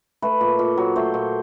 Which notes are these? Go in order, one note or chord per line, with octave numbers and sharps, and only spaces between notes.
A3 B4
A#2
A#2
F#3
A3 C5
A#2